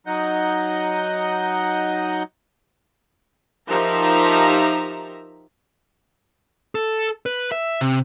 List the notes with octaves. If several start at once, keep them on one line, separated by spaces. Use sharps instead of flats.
F#3 D#4 D#5 F#5 G6
F3 D#4 G4 A#4 E5 A#5
A4
B4
E5
C3